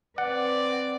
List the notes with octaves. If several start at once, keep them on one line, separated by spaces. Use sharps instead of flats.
C4 B4 D5 F#5